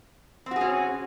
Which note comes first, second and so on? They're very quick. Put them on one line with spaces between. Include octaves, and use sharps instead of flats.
C4 F#4 G#4 C#4